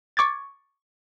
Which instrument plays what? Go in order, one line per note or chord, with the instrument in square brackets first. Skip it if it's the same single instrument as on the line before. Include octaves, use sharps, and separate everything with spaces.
[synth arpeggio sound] C#6 D6 G#6 A6